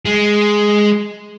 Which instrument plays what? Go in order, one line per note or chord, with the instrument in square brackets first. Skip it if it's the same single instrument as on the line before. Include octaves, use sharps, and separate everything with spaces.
[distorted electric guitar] G#3